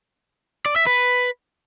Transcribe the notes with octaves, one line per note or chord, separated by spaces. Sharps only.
D5
E5
B4